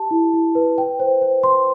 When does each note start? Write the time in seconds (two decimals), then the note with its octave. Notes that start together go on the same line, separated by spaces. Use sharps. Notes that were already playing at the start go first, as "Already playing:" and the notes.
Already playing: G4 A5
0.11 E4
0.33 E4
0.55 B4
0.78 G5
1.00 C5
1.22 C5
1.43 C6